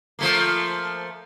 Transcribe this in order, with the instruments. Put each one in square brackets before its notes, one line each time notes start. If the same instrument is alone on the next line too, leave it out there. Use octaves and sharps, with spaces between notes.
[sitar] F3 A3 A#3